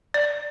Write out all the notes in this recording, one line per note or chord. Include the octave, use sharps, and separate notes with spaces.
D5